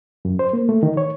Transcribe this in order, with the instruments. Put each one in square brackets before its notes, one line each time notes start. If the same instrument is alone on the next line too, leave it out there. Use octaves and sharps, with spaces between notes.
[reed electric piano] F#2
C5
A#3
A3
D#3
C#5